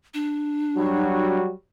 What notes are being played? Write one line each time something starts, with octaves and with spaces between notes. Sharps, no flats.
D4
F#3 G3 F#4